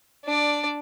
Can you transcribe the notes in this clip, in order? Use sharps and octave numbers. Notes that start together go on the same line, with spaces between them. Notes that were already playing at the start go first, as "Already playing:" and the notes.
D4 D5